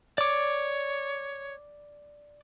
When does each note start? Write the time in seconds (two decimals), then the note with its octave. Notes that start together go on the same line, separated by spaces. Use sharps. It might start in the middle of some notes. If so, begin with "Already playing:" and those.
0.18 C#5 D5 D6